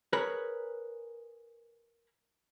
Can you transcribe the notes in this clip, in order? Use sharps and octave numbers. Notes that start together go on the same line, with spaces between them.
G#4 A#4 B4 C#5 A#5 B5